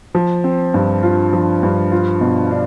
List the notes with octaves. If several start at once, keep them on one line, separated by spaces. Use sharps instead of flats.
F3
C4
G2
F4
F3
G2
F4
B2
D4